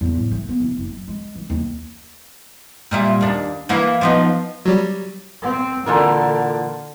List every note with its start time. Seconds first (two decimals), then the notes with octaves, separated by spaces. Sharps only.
0.01 E2
0.15 A2
0.31 A3
0.49 B3
0.60 D1
0.76 F#1
0.92 F#2
1.08 G#3
1.35 E3
1.50 D#2
2.91 A#2 G3 E4
3.21 D#2 D4
3.69 E3 A#3 E4
4.01 F3 B3 D#4
4.65 F#3 G3
5.43 C4
5.86 A#2 D3 E3 A#4